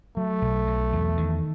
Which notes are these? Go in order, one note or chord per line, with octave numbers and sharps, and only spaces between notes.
F#3 A3
B1
F#3
E2
D#3